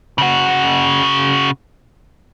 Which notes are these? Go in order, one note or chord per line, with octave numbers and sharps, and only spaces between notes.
C#3 F#4